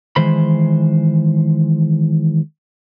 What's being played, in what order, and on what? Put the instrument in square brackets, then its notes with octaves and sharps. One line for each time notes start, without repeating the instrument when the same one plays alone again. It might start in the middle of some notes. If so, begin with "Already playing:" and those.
[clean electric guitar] D#3 E3 G#3 C5 B5